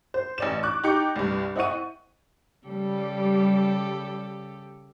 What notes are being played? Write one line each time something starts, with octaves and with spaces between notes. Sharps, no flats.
C5
A1 D5 E7
C#6 D6 F#6
D#4 G4 D6 G6 C#7
C2 G2
C4 E4 D#5 F#5 C#6 D#7
C#3 G3 G4 A4